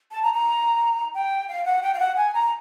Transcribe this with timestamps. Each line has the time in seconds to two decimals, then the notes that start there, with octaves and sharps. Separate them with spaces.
0.12 A5
0.23 A#5
0.34 A#5
1.15 G5
1.49 F5
1.65 F#5
1.83 G5
1.94 F5
2.00 F#5
2.16 G#5
2.34 A#5